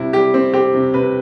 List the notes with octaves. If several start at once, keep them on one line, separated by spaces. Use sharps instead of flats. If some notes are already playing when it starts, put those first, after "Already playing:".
Already playing: C3 G3 E4
G3 G4
C4
C4 G4
C3
C3 B4